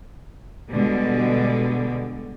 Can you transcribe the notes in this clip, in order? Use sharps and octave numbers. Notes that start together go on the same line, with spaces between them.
B2 D3 G3 G#3